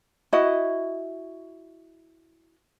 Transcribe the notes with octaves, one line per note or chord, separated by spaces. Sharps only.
E4 F#4 D#5